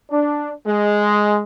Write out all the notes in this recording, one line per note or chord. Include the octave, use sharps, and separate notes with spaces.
D4
G#3